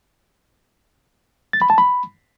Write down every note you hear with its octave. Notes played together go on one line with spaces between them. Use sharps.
A6
B5
A5
B5